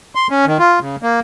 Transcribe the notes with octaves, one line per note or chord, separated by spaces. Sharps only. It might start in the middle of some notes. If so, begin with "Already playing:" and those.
C6
C#4
D#3
F4
C#3
A#3